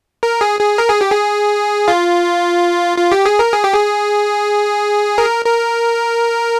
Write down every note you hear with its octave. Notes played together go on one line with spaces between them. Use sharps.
A#4
G#4
G#4
A#4
G#4
G4
G#4
F4
F4
G4
G#4
A#4
G#4
G4
G#4
A#4
A#4